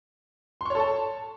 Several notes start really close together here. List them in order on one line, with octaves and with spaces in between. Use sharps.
C6 C#6 C#5 A4 A5